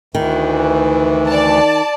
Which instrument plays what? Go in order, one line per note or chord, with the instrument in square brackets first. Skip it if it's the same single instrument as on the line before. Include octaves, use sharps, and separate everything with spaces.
[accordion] D2 E3 [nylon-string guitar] D#3
[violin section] D5 A5